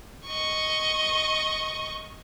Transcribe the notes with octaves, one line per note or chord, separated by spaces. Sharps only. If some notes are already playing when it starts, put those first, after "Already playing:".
D#5 C#6